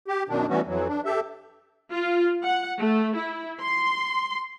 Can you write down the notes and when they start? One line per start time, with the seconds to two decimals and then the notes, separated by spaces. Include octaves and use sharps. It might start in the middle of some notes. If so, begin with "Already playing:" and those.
0.08 G4
0.29 F#2 B2 D#3 D4
0.49 E3 G3 A3 B3 C#4 F#4
0.67 F2 E3 F#3
0.88 D4
1.05 G4 A4 E5
1.91 F4
2.43 F#5
2.79 A3
3.16 E4
3.60 C6